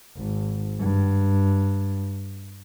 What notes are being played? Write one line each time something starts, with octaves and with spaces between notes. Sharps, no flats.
G#1
G2